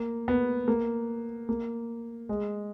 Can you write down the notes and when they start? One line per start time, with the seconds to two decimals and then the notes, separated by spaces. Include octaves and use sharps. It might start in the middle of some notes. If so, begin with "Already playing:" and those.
Already playing: A#3
0.28 B3
0.68 A#3
1.49 A#3
2.29 G#3